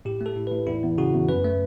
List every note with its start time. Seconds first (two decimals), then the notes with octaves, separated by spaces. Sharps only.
0.05 A2 G4
0.21 A3
0.26 A4
0.36 A2
0.47 A2 B4
0.67 E2 E4
0.83 E2
0.98 C#3 F#4
1.13 E2
1.29 F#2 B4
1.44 A3